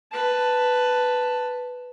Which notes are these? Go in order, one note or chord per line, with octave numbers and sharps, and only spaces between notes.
B4 A5